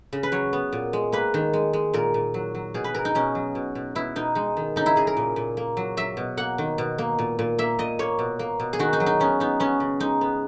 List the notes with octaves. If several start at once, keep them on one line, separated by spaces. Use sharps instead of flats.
C#3
B4
F#3 C#5
B3
A#2
G#3
A#3 B4
D#3
G#3
G#3
A#2 A#4
A#2
F#3
F#3
B2 G#4
B4
B2 A#4
D#4
B2 C#4
F#3
B2
B2
B2 E4
B2 D#4
G#3 D#4
D#3
C#3 D#4
E4
C#3 G#4
A#4
A#2
A#2
A#3
F#3
F#3 E5
B2
A#3 F#5
D#3
B2
A#3
A#2
A#2
A#3 E5
A#2 D#5
A#3 C#5
B2
A#3
B2
G#4
D#3 F#4
D#4
F#3
D#4
B3 C#4
B3 D#4
B3 C#4
C#3
G#3 D#4
B3